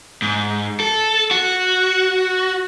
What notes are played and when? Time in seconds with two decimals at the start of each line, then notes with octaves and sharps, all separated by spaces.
0.22 G#2
0.80 A4
1.31 F#4